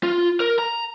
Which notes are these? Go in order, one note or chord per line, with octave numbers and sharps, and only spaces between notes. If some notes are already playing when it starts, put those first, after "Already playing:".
F4
A#4
A#5